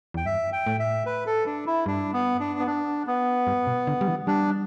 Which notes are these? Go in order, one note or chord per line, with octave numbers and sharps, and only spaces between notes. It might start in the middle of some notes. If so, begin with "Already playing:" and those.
E2 G5
G2 E5
G5
A2
E5
B4
A4
D4
E4
G2 D4
B3
D4
B3
D4
B3
G2
B2
D3
G3
E3
G3 D4